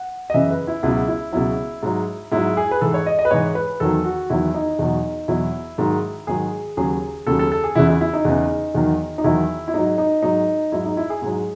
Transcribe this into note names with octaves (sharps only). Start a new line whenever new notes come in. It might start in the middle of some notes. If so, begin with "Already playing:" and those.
Already playing: F#5
D#5
F#2 C#3 E3 E5
B4
E4
C#2 B2 F#3 E4
E4
C#2 B2 F#3 E4
G#2 F#3
G#2 F#3 E4
G#4
B4
G#2 E3 A4
C#5
D#5
D#5
B4
G#2 E3 C#5
B4
E2 D#3 F#3 A4
F#4
E2 D#3 F#3 E4
D#4
E2 B2 F#3
E2 B2 F#3 E4
G#2 D#3 F#3
G#2 D#3 F#3 G#4
D#2 C#3 F#3 G#4
D#2 C#3 F#3 A4
A4
A4
G#4
E2 C#3 E3 E4
E4
E4
D#4
E2 C#3 E3
E2 D#3 F#3
D#4
E2 D#3 F#3 E4
E4
G#2 F#3 D#4
D#4
G#2 F#3 D#4
G#2 F#3 E4
D#4
E4
G#4
G#2 F#3